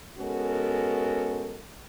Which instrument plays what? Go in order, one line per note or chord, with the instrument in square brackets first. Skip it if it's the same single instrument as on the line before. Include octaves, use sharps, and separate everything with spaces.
[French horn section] G#3 B3 C#4 F#4 A4 A#4